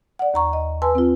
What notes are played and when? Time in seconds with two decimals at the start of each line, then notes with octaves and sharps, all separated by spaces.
0.19 D5 F#5
0.34 D#2 A#5 C#6
0.53 D#5
0.82 B4 G#5 A5 C6 E6
0.95 C4 F4